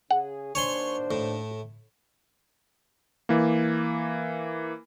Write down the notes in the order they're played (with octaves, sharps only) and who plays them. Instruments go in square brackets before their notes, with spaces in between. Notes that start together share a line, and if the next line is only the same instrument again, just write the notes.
[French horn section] C#3 G#4 [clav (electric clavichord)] F#5
[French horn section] D#2 D4 C5 [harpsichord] C#5 G#5 C6
[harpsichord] A2
[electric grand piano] E3 A#3